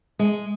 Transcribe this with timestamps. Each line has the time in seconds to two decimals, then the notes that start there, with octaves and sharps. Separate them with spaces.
0.19 G#3